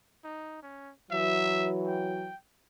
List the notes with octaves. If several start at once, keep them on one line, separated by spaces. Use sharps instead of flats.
D#4
C#4
E3 F#3 E5
G5